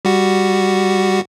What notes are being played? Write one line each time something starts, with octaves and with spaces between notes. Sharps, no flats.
G3 F#4